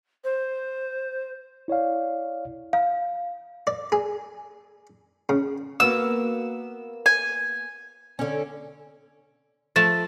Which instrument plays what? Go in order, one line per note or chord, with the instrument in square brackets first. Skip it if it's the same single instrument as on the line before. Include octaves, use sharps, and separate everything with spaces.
[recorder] C5
[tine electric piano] E4 C#5 D5 F5
[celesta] F5
[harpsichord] D5
G#4
C#3
[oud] A#3 B3 F#4 [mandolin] E6
[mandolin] G#5
[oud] D3 C#4
[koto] F3 A3 A5 [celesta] A6